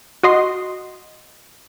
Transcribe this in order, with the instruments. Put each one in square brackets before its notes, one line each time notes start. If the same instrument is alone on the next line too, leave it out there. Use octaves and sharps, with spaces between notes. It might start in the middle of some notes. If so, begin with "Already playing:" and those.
[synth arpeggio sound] F#4 D#5 C6